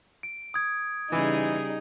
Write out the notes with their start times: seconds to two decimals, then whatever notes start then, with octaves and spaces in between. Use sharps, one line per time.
0.23 D7
0.54 D#6 G#6
1.12 C#3 E3 G3 D#4 G#4